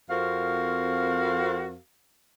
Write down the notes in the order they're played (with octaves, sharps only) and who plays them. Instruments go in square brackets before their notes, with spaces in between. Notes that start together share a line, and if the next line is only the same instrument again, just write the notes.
[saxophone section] F2 C4 F#4 A#4 F5